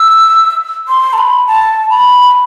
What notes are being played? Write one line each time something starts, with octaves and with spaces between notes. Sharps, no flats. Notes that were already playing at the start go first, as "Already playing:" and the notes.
Already playing: E6
C6
A5
B5
A5
B5